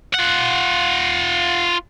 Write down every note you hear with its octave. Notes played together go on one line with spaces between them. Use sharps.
F4 F#5